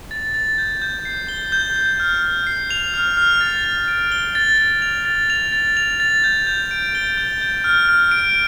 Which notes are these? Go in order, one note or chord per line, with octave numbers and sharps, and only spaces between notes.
A6
A6
G6
G6
C7
G7
G6
G6
F6
F6
C7
F7
F6
F6
A6
A6
D7
G7
A6
A6
F7
A6
F7
A6
F7
A6
G6
G6
D7
G7
G6
G6
F6
F6
D7